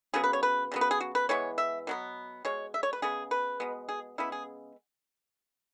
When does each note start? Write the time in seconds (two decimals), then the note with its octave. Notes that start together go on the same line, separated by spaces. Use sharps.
0.14 C#3 F#3 B3 G#4
0.24 B4
0.33 C#5
0.43 B4
0.72 C#3 F#3 B3
0.81 B4
0.91 G#4
1.01 F#4
1.15 B4
1.29 E3 G#3 B3 C#5
1.58 E5
1.87 B2 F#3 B3
2.45 B2 G#3 C#5
2.74 E5
2.83 C#5
2.93 B4
3.02 C#3 G#3 B3 G#4
3.31 B4
3.60 B2 G#3 B3
3.89 G#4
4.18 C#3 G#3 B3 E4
4.32 G#4